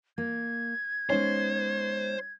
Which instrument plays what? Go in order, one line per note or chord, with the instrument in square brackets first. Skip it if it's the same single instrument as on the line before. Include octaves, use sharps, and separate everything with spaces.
[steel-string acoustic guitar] A#3 [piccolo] G#6
[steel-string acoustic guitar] G#3 B3 D#4 [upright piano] C#4 [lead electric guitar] C5